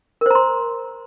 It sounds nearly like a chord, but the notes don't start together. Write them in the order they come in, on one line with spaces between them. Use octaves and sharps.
A#4 C5 A#5 C6